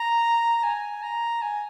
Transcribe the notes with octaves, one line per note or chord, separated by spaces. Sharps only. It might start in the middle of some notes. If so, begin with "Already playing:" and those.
Already playing: A#5
G#5
A#5
G#5